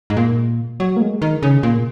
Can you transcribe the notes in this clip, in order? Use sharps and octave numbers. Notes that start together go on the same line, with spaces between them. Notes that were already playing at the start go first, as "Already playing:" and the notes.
G#2
A#2
F#3
A#3
G#3
D#3
C#3
A#2